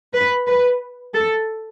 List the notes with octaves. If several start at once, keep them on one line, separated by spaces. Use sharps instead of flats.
B4
B4
A4